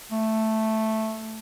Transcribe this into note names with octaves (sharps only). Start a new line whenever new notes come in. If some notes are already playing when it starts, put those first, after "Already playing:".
A3